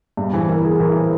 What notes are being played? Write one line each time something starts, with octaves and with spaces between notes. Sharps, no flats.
G2
E3 C5
E3 A#4
E3 G#4
E3 A#4
C5